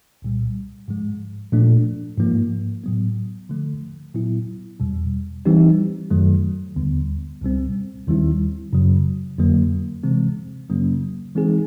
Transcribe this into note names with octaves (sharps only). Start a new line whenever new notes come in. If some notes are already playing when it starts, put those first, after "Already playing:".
C2 A#2 G3
G#2 F3 G#3
A#2 F3 A3 D4
G#2 F3 A#3
A2 F#3 B3
D3 F3 A3
A#2 F#3 B3 E4
E2 B2 G3
E3 G3 C4 D#4 G4
F#2 D#3 F#3 A3
D#2 D3 G3 B3
C#2 B2 G3 C4
D#2 D#3 G3 C4 E4
F#2 C#3 F#3
F2 D3 F#3 A#3
C3 E3 G#3 C4
F#2 C#3 F#3 A#3 C#4
E3 G#3 C4 D#4 G#4